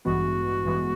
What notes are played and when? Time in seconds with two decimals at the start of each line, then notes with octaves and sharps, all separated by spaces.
0.05 A1 G2 E3 G#3 B3 F#4
0.64 A1 G2 E3 G#3 B3